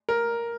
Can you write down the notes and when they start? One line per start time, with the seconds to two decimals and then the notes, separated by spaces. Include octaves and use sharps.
0.09 A#4